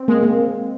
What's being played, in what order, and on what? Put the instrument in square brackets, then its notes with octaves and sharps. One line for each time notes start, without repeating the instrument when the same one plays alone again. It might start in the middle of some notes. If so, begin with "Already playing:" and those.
Already playing: [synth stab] C4
[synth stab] G#3 [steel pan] A#3
[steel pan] A#3